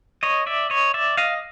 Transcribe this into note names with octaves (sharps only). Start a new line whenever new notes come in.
C#5 D#5
D5 E5
C#5 D#5
D5 E5
D#5 F5